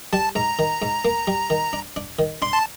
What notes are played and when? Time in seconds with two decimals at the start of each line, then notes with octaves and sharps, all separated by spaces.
0.13 G3 A5
0.35 G#2 A#5
0.59 D#3
0.82 G#2
1.05 A#3
1.27 G3
1.50 D#3
1.73 D4
1.96 D4
2.19 D#3
2.42 D4 C6
2.53 A5